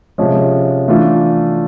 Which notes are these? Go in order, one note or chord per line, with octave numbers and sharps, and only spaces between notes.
C3 F3 G#3 C#4
E3 A3 D4 F4